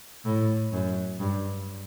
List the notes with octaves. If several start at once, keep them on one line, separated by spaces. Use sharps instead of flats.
A2
F#2
G2